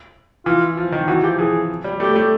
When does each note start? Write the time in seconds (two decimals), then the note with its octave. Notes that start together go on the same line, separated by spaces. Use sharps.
0.46 E3 F4
0.77 F3
0.92 D#3
1.08 E3 F#4
1.23 F3 G4
1.39 E3 G#4
1.84 G3
2.00 A3 G4
2.16 A3